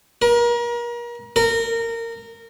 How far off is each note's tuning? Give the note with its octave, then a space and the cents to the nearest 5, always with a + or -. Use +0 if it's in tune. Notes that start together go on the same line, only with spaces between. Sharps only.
A#4 +35
A#4 -20